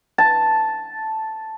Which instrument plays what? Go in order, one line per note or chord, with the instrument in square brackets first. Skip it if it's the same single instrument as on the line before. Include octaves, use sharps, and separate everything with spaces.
[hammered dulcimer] A5